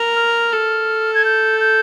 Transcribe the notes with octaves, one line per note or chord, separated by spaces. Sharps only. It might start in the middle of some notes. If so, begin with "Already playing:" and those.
Already playing: A#4
F6
A4
G#6
G6
G6